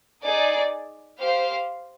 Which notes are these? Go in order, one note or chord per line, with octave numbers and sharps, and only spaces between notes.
D#4 G#4 D5
G4 C5 F5